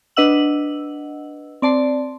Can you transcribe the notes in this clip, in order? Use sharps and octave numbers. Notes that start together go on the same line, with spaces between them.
D4 B4 D#5 F#5 E6 F#7
C4 D5 A5 C6